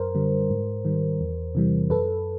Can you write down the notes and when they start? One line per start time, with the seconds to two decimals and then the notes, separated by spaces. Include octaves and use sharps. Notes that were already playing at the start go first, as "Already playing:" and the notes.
Already playing: F#2 A#4 C5
0.15 D3 G3
0.50 G#2
0.85 D#3 G3
1.21 E2
1.55 C3 E3 G3
1.90 F#2 A4 B4